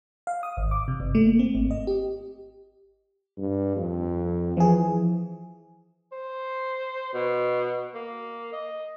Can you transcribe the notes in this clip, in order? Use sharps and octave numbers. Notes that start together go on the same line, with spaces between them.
F5
D#6
G#1
D6
C3
G1
A3
A#3
C4
G#1
D#5
G4
G2
F2
E3 F3 G#4
C5
B2
A#3
D#5